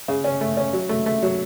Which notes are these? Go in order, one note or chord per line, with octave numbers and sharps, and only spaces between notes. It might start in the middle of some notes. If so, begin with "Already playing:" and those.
C#3
C#4
A3
C#4
F#3
A3
A3
F#3